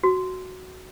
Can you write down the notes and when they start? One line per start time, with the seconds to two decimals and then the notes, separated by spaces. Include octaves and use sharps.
0.03 F#4